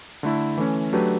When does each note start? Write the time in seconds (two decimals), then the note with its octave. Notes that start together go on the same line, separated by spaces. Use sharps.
0.23 D3 A3 E4
0.57 E3 A3 C#4
0.93 F#3 A3 D4 G4 B4